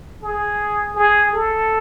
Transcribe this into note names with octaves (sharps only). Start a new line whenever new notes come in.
G#4
G#4
A4